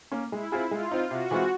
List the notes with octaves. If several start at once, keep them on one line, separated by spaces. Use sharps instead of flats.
A#3 C#4
G#3 E4
C4 F4 G#4
G#3 F4
C4 D#4
C3 F#4
E3 G#3 C4 F4